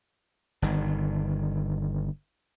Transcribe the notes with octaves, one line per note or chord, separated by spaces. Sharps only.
G1 D#3